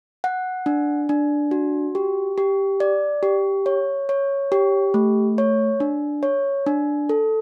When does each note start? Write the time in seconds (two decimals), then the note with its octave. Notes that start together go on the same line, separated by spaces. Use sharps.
0.24 F#5
0.66 D4
1.09 D4
1.51 F#4
1.95 G4
2.38 G4
2.80 D5
3.23 G4
3.66 C#5
4.09 C#5
4.52 G4
4.94 A3
5.38 C#5
5.80 D4
6.23 C#5
6.66 D4
7.09 A4